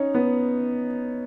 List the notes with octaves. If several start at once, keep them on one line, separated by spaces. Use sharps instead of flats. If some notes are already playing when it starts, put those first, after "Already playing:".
Already playing: C#4 D#4
B3